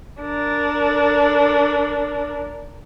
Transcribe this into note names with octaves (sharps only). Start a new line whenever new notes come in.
D4 A#4